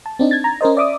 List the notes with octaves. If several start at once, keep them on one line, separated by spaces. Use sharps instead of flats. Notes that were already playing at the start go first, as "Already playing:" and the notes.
A5
C4 D4 D#4
G#6 A6
A#5
C#4 A#4 C5 D#5
D5 E5 D6 D#6